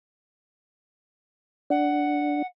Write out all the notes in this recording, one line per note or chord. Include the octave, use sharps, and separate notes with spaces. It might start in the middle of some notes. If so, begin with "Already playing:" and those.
D4 F#5